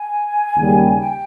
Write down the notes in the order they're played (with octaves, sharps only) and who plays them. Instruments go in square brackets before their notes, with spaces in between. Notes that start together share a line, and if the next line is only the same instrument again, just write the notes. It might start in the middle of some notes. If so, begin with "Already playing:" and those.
Already playing: [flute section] G#5
[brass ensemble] D#2 C#3 G3
[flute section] G5